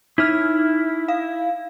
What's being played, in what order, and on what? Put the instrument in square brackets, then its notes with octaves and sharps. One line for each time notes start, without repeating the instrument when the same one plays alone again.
[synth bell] D#4 F6 [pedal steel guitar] E4
[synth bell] F5